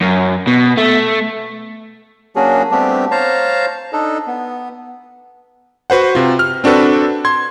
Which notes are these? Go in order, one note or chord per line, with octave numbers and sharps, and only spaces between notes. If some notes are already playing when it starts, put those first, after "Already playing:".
F#2
B2
A3
F#3 A#3 C#4 D4 F#4 G#4
G3 A3 B3 C4 D4 G4
C5 C#5 F5 A5 A#5
D4 D#4 A4
B3
F#4 B4 C5 F#5
C3 F4
F6
C4 D4 F#4 A4 B4
C6 G#6